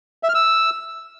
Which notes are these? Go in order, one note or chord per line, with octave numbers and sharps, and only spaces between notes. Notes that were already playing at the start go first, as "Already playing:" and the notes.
E5
F6
E6